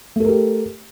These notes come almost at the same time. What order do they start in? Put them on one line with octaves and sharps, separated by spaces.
A3 A4 A#4 G4